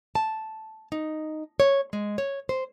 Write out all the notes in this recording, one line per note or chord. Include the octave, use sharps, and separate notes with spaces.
A5
D#4
C#5
G#3
C#5
C5